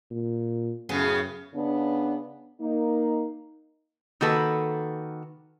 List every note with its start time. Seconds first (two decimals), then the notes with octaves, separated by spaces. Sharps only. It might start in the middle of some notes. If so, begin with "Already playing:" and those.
0.11 A#2
0.89 F#2 A2 C#3 B3 G#4
1.54 C#3 B3 D4
2.60 A#3 D#4
4.21 D#3 A#3 F#4 A4 B4